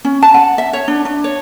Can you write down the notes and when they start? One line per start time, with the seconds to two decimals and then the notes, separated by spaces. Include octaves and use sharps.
0.05 C#4
0.23 A5
0.34 F#5
0.58 E5
0.73 C#5
0.88 D4
1.05 D4
1.24 C#5